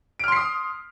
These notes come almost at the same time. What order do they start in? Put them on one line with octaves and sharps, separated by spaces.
D7 F6 C6 C7 D#6